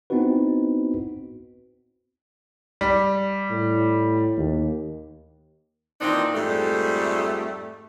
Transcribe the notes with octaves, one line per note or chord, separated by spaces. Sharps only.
B3 C4 D#4 E4 F#4 B4
G3
A2
D#2
A#2 D#3 E3 C4 D4 D#4
F2 G#2 G3 A3